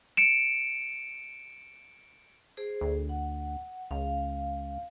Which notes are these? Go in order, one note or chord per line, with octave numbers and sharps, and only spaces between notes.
C#7 D7 E7
G#4 C5
D2
F#5
C#2 F5